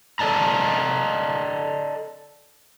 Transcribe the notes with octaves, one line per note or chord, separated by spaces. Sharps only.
A4 D5 D#5 A5 A#5